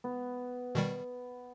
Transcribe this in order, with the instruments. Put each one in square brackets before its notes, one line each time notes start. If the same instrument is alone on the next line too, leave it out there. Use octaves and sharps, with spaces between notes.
[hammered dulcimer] B3
[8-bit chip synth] B2 D#3 G3